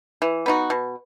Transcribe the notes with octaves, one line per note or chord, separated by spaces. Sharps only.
E3
B3 D#4 F#4
B2